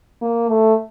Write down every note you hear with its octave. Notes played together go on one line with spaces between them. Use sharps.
A#3
A3